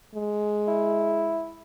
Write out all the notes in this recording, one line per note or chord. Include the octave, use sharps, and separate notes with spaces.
G#3
E4